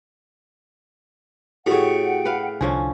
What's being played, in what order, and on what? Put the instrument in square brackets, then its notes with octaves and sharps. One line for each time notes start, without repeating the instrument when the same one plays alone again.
[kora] A2 C#5 [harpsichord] C#3 A3 [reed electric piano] F#4 G4 [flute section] F#5 G5
[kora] B4 F5
[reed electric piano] C2 G#5 [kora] D3 F3 C#4